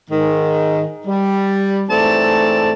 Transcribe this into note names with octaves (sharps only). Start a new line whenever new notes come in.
G#2 D#3
G3
G#2 E3 A3 C4 D5 A5